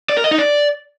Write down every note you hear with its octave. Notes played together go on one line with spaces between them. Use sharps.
D5
A#4
D#5
D#4
D5